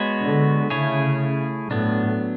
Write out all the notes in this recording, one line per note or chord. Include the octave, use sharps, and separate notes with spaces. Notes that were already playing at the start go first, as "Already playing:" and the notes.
Already playing: G#3 B3 F#4 C#5
D3
C#3 A3 E4 G#4 C#5
A2 F#3 B3 D4